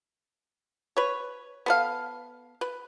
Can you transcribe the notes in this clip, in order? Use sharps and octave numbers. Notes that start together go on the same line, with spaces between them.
B4 C#5
B3 A4 F5
B4